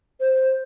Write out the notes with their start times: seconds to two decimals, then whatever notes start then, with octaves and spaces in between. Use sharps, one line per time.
0.20 C5